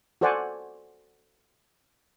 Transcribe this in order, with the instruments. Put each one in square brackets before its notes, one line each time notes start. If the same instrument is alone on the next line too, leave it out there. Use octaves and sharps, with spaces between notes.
[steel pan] F#4 A4 C5 D5 F#5 G#5